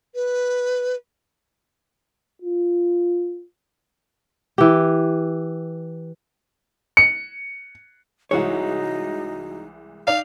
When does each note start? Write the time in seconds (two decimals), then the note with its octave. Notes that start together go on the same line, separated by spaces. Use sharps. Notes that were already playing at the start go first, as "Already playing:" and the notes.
0.15 B4
2.42 F4
4.58 E3 G4
6.97 C#7
8.31 C2 E3 G#3 D#4 F#4 C#5
10.07 D#4 D5 F5 F7